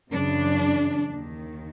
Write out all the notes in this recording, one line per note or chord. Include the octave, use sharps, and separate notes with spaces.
F#2 C#3 E3 D4
D#2 D#3